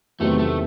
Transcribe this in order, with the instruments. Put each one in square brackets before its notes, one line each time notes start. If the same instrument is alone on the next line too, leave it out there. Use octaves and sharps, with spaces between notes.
[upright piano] E2 C3 D#3 F#3 C4 [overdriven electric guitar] A3
[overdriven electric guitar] A3